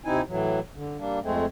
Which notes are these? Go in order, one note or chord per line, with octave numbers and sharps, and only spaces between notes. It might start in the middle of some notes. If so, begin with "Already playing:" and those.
D#2 C3 C4 D#4 E4 G#5
A2 E3 F#3
D3
G3 A#3 D4
F2 G#3 A3 C4